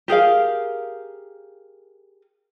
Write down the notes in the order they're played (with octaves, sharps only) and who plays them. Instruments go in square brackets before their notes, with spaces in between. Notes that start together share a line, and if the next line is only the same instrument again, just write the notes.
[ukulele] G4 G#4 A#4 F5